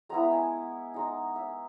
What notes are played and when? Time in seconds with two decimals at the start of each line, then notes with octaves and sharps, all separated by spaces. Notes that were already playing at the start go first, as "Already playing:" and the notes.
0.09 G#3 B3 E4 A#5
0.31 G#5
0.94 G#3 D#4
1.36 E5